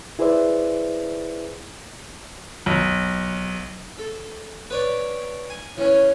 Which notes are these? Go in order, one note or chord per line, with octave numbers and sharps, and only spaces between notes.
E4 G#4 B4 C5 D5 E5
B1
A4
B4 C#5 D5
G#5
E3 C#4 C#5